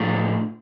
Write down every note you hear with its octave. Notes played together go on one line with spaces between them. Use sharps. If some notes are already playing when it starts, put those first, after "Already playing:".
Already playing: A2 F3 A3 D4 F4